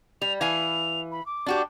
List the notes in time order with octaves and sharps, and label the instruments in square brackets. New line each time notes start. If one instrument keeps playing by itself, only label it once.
[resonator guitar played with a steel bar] G3 [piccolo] F7
[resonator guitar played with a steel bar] E3 F5 G#5 [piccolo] F7
[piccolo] B5
D6
[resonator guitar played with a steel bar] D4 F#4 G4